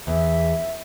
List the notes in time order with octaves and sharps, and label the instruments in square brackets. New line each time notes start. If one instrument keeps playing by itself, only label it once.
[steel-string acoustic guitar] E2 [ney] E5